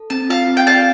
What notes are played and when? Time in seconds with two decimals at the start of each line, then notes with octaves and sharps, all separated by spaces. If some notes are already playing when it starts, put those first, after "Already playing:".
Already playing: A4
0.10 C4 A5
0.29 F4 F5 A5
0.48 C4
0.57 G5
0.67 D5 F5 A5